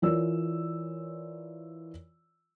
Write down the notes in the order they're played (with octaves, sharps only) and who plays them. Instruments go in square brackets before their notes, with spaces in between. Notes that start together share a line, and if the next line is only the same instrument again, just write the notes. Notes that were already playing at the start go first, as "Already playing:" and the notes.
[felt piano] E3 F4 A#4 C#5 D5 E6